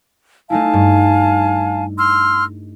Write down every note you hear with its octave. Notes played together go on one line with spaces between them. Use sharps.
A3 D#4 E4 F5 G#5 A5
G2
C6 E6 F6